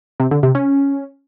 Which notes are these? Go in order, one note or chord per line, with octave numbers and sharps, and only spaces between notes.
C3
D3
C3
C#4